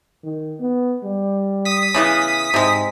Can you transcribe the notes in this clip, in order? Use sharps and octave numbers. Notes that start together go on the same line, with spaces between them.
D#3
B3
G3
D#6 B6
C#3 E3 B3
G#2 C3 G#3